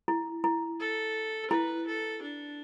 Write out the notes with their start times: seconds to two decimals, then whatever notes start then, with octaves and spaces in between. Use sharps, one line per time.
0.08 E4
0.44 E4
0.80 A4
1.51 E4 B4
1.87 A4
2.22 D4